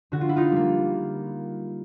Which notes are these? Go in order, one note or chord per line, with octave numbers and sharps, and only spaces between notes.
D3 F#4
F4
E4
D#4 F4
G3 A#3